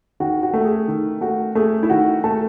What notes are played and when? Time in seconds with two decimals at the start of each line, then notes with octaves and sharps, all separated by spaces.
0.20 D#3 F#4
0.43 F#4
0.54 A3
0.65 G#4
0.88 D#3
1.21 A3 F#4
1.55 A3 G#4
1.83 E4
1.90 D#3 F#4
2.24 A3 A4